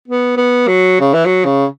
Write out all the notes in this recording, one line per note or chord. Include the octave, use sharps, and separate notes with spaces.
B3
B3
F#3
C#3
E3
F#3
C#3